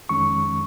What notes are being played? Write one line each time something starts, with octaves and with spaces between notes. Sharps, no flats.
F2 D#3 G#3 C#4 C#6